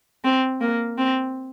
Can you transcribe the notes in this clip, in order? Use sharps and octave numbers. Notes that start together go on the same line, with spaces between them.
C4
A#3
C4